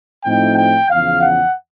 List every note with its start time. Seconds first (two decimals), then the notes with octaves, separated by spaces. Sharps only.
0.25 A2 F3 A3 C4 D#4 G5
0.58 G5
0.89 E2 C#3 F3 F5
1.22 F#5